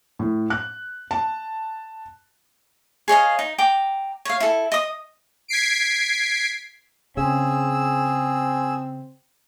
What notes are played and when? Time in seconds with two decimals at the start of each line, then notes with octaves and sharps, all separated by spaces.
0.19 A2
0.50 F#6
1.11 A5
3.08 G#4 C#5 D#5 F5
3.39 D#4
3.58 G5 A#5 D6
4.25 C#5 F5
4.40 E4 A4
4.72 D#5 D#6
5.48 G#6 B6 C7 D7
7.17 C#3 C4 G#4 E6